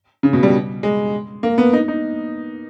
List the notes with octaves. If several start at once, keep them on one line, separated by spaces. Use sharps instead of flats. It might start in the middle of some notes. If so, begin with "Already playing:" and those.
C#3
B2
G3
G#3
A#3
B3
D#4
D#4